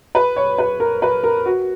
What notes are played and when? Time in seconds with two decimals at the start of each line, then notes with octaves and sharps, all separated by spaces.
0.15 B4
0.36 C#5
0.58 B4
0.80 A#4
1.02 B4
1.23 A#4
1.45 F#4